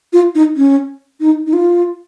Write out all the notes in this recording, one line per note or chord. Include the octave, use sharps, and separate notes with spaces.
F4
D#4
C#4
D#4
D#4
F4